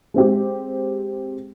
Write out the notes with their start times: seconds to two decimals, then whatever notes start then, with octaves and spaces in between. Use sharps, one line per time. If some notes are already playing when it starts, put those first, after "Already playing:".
0.14 G#3 C4 G4